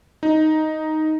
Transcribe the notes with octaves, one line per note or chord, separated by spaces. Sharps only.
D#4